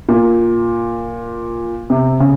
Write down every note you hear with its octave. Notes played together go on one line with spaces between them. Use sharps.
A#2
C3
C#3